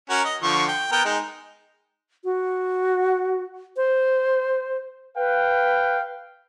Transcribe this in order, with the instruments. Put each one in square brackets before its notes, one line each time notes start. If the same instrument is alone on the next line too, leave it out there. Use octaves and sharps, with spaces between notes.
[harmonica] C#4 F#4 A#4
D#5
D3 F3 C#6
G5
B3 A#4 G5
G#3 D#4
[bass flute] F#4
C5
[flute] B4 [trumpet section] F5 G5